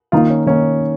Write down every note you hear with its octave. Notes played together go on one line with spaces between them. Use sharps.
D#3 A#3 D#4 F4
C#4
D#3 A#3 C#4 D#4